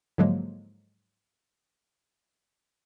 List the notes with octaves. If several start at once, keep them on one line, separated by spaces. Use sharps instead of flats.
G#2 D3 F3 F#3 G#3 A#3